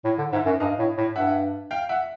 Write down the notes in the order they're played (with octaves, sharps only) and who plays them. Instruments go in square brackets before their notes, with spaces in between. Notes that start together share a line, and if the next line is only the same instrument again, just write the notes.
[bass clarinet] A2
D3
[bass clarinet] G#2 [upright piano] E5 F#5
[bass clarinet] F#2
[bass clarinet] G2 [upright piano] D#5 F5
[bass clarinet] A2
A2
[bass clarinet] G2 [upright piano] E5 F#5
[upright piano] F5 G5
E5 F#5